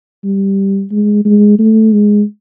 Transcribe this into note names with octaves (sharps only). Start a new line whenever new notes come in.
G3
G#3
G#3
A3
G#3